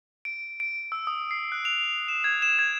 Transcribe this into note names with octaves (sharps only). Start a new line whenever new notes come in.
D7
D7
E6
D#6
C7
F#6
F7
F7
E7
G#6
E7
G#6